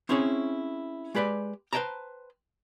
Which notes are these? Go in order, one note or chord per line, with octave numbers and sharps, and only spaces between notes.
C4 C#4 E4 G#4 C#5
G#3 G4 B4 C#5 D5
B4 C5 D5 G5 A5 A#5